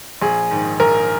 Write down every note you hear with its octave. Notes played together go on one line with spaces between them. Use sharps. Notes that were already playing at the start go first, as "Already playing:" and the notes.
A#1 G#4
G#2 D#3
A#1 A#4